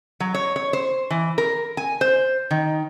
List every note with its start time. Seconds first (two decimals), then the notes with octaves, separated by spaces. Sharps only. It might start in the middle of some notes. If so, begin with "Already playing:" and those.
0.20 F#3
0.35 C#5
0.56 C#5
0.73 C5
1.10 E3
1.38 A#4
1.77 G#5
2.01 C5
2.51 D#3